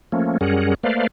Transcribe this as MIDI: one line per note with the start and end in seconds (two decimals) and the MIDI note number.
0.12 0.38 53
0.12 0.38 57
0.12 0.38 58
0.12 0.38 61
0.41 0.74 42
0.41 0.74 55
0.41 0.74 61
0.41 0.74 68
0.41 0.74 70
0.41 0.74 78
0.83 1.07 57
0.83 1.07 58
0.83 1.07 71
0.83 1.07 72
0.83 1.07 74
0.83 1.07 77